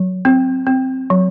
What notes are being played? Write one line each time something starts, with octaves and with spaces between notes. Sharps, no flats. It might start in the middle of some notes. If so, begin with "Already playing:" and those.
Already playing: F#3
C4
C4
F#3